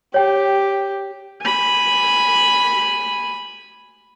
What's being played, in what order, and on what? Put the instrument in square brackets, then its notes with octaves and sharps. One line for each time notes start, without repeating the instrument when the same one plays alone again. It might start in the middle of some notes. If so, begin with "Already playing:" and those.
[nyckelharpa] G4 [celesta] C#5 G5
[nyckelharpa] G#5 B5